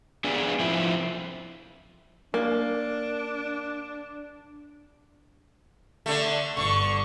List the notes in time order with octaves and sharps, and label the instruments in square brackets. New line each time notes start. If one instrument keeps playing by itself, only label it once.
[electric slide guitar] B3 D4 G#4
F3 C4 E4
[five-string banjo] A#3 [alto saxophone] D4
[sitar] D3 A3
[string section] G1 C#6 [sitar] D3